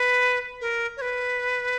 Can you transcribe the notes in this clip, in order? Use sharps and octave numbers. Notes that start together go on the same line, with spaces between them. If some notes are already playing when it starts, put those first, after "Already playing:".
Already playing: B4
A#4
C#5
B4